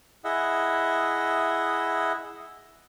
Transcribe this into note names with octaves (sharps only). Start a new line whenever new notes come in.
E4 G#4 D#5 E5 F#5